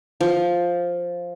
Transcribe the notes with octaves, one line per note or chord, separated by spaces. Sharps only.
F3